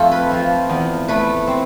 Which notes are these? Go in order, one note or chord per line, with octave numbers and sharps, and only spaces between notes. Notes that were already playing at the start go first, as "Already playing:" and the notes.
Already playing: F2 A3 F4 A4
B4
F3
E2
A3 B4
C4